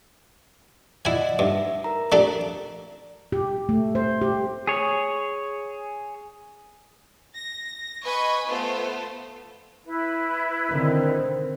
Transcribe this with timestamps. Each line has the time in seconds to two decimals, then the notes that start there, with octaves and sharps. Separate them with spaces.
1.05 E4 D5 D#5 F#5 G#5
1.39 G2 D#4 E5
1.84 A#4 A#5
2.12 A3 D4 G4
3.32 G4
3.69 A3
3.95 C5
4.21 G4
4.67 G#4 C#5
7.32 A#6
8.04 B4 D#5 G#5 B5 C#6
8.49 A3 B3 F4 A4 C5
9.85 E4 B4
10.72 D3 D#3 C4